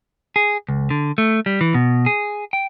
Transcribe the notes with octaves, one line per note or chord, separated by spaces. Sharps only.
G#4
C#2
D3
A3
G3
E3
B2
G#4
G5